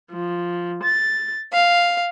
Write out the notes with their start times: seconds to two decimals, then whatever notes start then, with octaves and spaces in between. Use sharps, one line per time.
0.11 F3
0.83 A6
1.52 F5